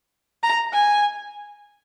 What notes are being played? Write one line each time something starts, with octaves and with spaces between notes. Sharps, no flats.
A#5
G#5